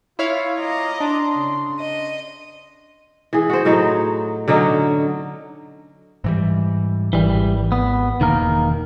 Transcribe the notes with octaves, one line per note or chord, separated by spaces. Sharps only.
E4 F4 C#5 F5
D#5 A#5 D6
D4 C6
C#3
D#5
E3 G#4
F#4 C5
A2 F#3 D#4
D3 F#3 C#4 D#4
G#2 E3 G3
G#1 E3 G3
B3
E1 D#3 A#3 A#4